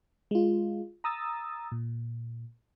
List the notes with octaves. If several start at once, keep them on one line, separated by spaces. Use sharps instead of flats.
G#3 F4
A#5 D#6 E6 A6
A#2